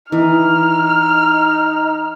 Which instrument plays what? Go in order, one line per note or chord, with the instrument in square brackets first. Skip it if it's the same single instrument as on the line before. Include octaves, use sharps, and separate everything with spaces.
[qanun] E3 [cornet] D#4 [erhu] F6